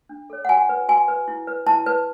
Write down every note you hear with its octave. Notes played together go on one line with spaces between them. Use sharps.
D4
A4 C#5
F#5
F#4 G#5
B4
F#4 G#5
B4
E4
B4
E4 A5
B4